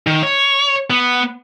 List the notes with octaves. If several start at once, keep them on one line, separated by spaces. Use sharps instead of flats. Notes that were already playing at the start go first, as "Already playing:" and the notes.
D#3
C#5
B3